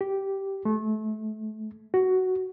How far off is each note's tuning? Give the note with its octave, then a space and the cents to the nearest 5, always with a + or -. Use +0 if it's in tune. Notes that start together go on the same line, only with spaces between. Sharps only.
G4 -10
A3 -30
F#4 +10